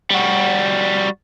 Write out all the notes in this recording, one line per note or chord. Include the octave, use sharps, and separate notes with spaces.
G3 F#4